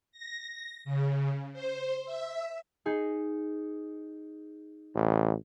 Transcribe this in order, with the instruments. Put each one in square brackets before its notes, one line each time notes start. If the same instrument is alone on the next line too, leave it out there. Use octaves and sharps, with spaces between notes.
[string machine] A#6
C#3
C5
E5
[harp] D#4 G#4 D#5
[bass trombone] A1